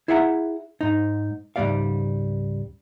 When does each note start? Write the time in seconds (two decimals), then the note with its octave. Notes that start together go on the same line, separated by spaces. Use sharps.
0.08 E4 G#4 E5 F#5 G#5 A#5
0.81 G#2 D#4
1.56 C#2 G#2 F3 G3 D5 F5